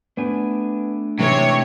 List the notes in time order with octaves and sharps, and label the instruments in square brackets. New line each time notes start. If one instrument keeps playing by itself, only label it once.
[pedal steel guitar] A3 D4 G#5 [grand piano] B3
[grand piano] G#2 E3 [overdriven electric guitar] C3 [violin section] C#5